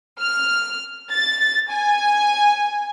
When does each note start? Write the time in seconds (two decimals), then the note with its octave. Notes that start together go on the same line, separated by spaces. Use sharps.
0.20 F6
1.11 A6
1.70 G#5